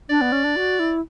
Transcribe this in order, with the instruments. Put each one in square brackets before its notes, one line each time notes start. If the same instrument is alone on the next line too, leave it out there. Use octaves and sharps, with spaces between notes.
[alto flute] D4 [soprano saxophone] D5
[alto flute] B3
C#4
D4
F#4
E4